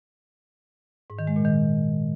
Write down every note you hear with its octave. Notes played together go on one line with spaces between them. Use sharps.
G#2
D#3
G#3
A#2
D#3